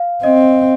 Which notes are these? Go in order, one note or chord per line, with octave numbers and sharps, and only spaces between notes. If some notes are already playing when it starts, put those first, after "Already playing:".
Already playing: F5
C4 D#5